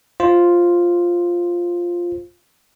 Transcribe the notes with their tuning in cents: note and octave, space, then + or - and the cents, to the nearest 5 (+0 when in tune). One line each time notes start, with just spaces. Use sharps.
F4 +0 C5 +10